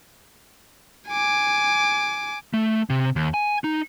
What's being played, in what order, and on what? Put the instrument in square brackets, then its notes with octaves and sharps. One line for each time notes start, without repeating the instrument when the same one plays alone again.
[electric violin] G#5 D6
[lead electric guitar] A3
C3
D#2
G#5
D#4